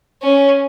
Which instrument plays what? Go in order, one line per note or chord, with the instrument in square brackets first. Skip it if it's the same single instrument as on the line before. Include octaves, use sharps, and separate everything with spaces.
[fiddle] C#4